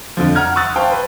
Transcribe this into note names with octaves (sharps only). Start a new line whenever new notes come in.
F2 D3 F3
F#5 A#5 F6 G#6
C#6 D#6 E6 F#6 A6
C5 F5 G5 A5
B4